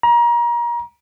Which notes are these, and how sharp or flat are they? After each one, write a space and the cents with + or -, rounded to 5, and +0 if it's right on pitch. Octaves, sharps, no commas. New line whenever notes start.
A#5 +30